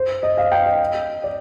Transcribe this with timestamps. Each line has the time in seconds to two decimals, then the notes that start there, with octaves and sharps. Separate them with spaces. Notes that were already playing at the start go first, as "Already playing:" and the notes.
Already playing: C5
0.23 D#5
0.37 F5
0.52 G5
0.66 D#5
1.24 D5